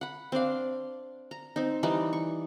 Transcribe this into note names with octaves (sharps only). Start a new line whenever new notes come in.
F#5 B5
C4 D4 D5 F5
A#5
C4 D#4
E3 G3 D#4 D5
C#6